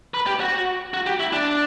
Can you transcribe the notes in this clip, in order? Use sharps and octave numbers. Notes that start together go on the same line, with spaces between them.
B4
G4
F#4
F#4
G4
E4
D4